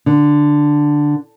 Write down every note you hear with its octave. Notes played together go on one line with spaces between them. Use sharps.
D3